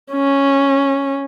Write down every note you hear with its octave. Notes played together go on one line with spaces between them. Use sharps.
C#4